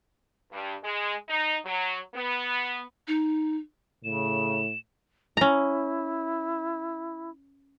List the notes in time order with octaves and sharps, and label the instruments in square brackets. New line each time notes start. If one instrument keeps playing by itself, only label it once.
[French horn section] G2
G#3
D#4
F#3
B3
[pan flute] D#4
[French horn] A2 [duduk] C#3 [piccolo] E7
[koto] C#4 A#5 [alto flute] E4